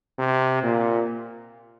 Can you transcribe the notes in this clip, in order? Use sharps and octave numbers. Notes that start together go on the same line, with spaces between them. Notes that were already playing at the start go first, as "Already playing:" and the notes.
C3
A#2